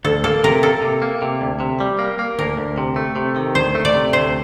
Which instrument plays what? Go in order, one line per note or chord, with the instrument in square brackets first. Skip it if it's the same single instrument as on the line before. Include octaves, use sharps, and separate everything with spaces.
[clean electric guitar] D2 [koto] A4
[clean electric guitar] A#3 [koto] A4
[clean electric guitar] C3 [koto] A#4
[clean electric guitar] A#3 [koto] A4
[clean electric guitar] C3
A#3
C3
D2
C3
G3
A#3
A#3
[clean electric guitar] D2 [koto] A#4
[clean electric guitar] D2
C3
A3
C3
D#3
[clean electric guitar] D2 [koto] C5
[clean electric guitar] A3
[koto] D5
[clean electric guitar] C3
[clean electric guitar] D2 [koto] C5